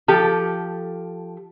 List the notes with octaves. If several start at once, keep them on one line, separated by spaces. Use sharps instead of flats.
F3 G4 A4